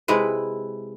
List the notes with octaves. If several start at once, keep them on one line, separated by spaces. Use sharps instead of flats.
C3 G#3 E4 B4